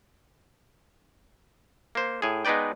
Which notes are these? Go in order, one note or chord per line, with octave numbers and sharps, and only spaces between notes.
A#3 C5
A2 G#4
G#3 B3 D#4 B4 D5 G5